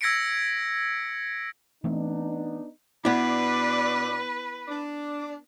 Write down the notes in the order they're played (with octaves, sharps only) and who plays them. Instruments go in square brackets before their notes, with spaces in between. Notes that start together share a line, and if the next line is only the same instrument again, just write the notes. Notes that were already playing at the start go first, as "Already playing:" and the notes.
[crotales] E6 G#6 A#6 B6 C#7 D7
[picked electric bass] E3 A3 C4 [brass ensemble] B3 D4 D#4
[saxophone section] B2 D4 D5 [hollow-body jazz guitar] B3 E4 [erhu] B4
[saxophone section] D4